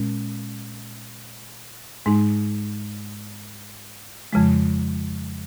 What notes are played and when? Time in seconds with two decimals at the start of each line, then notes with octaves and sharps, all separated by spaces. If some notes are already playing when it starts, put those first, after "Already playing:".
Already playing: A#2 G#3 C#4
2.06 G#2 G#3 D#4
4.33 F2 C#3 F3 G#3